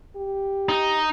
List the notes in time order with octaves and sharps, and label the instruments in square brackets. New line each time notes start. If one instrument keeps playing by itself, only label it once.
[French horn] G4
[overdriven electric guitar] D#4